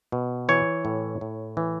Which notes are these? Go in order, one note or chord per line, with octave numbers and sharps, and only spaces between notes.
B2
E3 C#5
A2
A2
E3